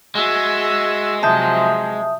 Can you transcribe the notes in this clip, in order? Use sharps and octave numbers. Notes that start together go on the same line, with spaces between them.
G#3 F#4 E5 E6
C3 F3 F#3 E5 A5 D#6 G6